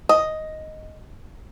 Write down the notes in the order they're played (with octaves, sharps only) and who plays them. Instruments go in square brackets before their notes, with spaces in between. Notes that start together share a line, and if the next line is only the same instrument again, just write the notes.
[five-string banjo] D#5